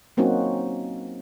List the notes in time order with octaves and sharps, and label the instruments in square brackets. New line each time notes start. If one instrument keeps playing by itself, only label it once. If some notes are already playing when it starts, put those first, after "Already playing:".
[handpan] F#3 A#3 C4 C#4 D#4 F#4